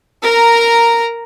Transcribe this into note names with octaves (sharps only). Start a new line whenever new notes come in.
A#4 A#5